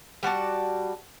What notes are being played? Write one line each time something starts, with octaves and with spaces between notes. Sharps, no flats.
G3 F#4 D5 A5